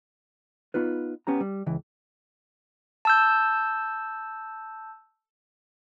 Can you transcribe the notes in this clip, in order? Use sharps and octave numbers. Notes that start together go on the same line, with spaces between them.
B3 D#4 F4 B4
B3 C#4 G4 A#5
G3
C#2 E3
A5 E6 G6